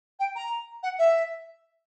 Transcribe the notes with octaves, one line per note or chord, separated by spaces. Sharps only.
G5
A#5
F#5
E5